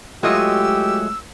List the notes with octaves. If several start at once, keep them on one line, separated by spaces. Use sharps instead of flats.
F#3 G#3 A3 F4 G4 G#4 D#5 E6